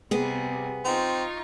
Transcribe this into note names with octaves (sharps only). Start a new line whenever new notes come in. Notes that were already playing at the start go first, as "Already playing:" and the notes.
C3 G3 B3 G#4
C4 D#4 F4 C#6